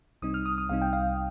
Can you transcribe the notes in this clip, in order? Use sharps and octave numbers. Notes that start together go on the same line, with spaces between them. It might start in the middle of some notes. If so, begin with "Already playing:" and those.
C2 C3 G3 C4 D#4 D#6
F6
D#6
D#6
C2 C3 G3 C4 D#4 F5
G5
F5